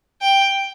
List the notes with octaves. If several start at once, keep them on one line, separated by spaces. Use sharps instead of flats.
G5